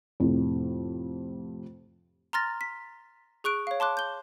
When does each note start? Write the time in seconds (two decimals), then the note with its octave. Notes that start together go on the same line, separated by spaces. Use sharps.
0.20 F2 A2 C3
2.33 A#5 C6 F6 A6 A#6
2.61 B6
3.44 G#4 C#6 F#6 D7
3.67 C#5 F5
3.80 A5 C6 D6 F#6
3.97 G6 G7